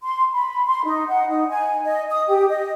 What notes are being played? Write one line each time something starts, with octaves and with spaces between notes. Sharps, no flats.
C6
B5
C6
D#4
F#5
D#4
G#5
D#5
D#6
G4
D#5